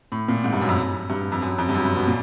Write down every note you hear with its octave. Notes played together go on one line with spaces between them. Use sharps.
A2
A#2
G#2
G2
F#2
F2
G2
F2
F#2
F2
G2
F#2
G2
B2
A#2